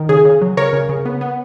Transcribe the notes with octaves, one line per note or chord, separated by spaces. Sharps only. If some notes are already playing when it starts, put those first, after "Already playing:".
Already playing: D#3
C#3 G#4
C#3
F#3
C#3 A#4 C#5
C#3
C#3
B3
B3